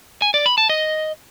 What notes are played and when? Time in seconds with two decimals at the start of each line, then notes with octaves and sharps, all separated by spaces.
0.22 G#5
0.34 D5
0.46 B5
0.58 A5
0.69 D#5